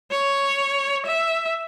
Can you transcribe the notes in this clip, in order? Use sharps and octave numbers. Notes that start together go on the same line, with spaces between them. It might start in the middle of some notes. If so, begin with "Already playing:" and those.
C#5
E5